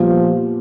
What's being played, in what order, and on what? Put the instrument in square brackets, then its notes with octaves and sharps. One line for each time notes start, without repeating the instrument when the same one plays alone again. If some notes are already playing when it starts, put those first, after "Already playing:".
Already playing: [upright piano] A#2 G3 B3 [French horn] F3